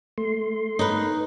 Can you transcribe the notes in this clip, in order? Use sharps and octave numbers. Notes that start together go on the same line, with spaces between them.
A3 C6
D#4 B4